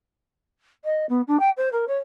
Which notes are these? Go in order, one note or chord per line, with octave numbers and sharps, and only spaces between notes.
D#5
B3
D4
G5
C5
A#4
C#5